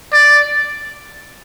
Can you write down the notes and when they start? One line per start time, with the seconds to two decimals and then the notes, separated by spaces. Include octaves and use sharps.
0.12 D5